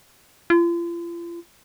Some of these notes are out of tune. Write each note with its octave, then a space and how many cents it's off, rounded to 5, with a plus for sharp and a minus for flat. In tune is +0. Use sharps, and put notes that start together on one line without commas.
F4 -40